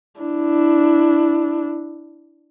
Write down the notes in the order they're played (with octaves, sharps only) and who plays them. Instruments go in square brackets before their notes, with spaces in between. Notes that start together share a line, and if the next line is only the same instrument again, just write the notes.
[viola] D4 E4